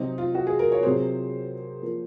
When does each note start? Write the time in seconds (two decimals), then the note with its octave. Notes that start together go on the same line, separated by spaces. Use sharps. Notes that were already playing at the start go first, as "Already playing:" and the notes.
Already playing: C3 F#3 C4 D#4
0.18 F4
0.35 F#4
0.47 G#4
0.59 A#4
0.72 C#5
0.83 C3 F#3 C4 F4 G#4 C5
1.82 F3 A#3